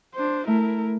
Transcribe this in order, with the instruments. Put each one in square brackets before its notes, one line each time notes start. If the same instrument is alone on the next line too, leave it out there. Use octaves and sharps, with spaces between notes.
[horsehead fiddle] D4 C5
[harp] A3 [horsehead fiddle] E4 A#4